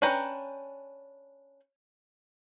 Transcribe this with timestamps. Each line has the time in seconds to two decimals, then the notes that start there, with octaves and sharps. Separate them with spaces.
0.02 C#4 D4 B4 G5 A#5